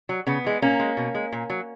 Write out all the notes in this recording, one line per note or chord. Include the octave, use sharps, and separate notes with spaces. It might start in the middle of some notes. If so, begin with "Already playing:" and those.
F#3
C#3 B3
E3 G#3
A#2 A#3 C#4
G#3
B2
G#3
A#2
F#3